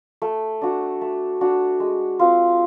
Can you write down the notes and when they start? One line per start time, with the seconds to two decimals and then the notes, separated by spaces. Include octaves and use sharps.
0.22 A3
0.62 D4 F#4
1.01 A3
1.41 D4 F#4
1.80 G#3
2.19 C4 F4